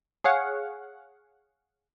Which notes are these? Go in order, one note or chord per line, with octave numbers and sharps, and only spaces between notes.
G#4 C#5 F5 F#5